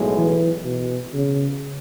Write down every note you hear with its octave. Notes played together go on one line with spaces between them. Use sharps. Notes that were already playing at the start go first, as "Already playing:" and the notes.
Already playing: B1 A2 G#3
E3
B2
C#3